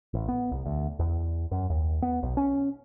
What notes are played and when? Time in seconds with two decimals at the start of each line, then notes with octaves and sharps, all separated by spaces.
0.14 A1
0.28 B3
0.51 C2
0.65 D2
0.99 E2
1.51 F#2
1.70 D#2
2.02 B3
2.23 B1
2.37 C#4